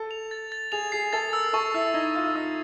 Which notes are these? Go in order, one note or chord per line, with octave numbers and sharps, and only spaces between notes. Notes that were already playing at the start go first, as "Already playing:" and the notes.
Already playing: A4
F7
A6
A6
G#4 F7
G#4 C7
A4 A6
A#4 E6
A4 C#6
E4 E6
D#4 G#6
F4 C#6
D#4 E6